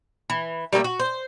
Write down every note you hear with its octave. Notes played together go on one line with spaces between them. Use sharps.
E3
G3 A3 A#3 E5
F#4
C5